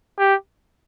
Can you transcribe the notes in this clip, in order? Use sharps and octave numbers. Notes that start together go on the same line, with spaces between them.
G4